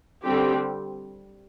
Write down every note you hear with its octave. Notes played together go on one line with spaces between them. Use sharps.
D3 G3 C4 G4